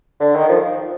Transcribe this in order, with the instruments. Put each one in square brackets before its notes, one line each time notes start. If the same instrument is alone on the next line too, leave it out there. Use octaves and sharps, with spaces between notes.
[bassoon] D3
D#3
F3